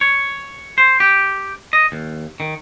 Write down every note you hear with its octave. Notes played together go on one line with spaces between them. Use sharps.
C#5
C5
G4
D#5
D#2
D#3